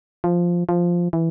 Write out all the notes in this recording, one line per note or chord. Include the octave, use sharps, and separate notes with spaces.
F3
F3
E3